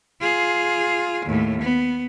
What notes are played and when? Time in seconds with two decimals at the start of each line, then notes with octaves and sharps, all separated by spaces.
0.21 F4 G#4
1.25 D#2 A2
1.62 B3